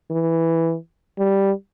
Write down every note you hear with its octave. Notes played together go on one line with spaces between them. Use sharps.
E3
G3